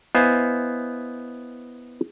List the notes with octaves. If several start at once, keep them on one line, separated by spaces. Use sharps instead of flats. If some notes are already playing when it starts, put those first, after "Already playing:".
B3 E4 C5 D#5 F5 G#5